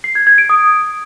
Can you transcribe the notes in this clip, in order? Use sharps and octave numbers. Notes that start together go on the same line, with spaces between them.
C7
G#6
G#6
D7
D#6